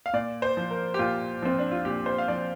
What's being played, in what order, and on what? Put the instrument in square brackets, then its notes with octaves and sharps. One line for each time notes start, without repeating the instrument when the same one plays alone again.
[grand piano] F5
A#2 D5
C5
F3
A#4
G4
A#2 F4
F3 C4
D4
F4
A#2 G4
C5
F5
F3 D5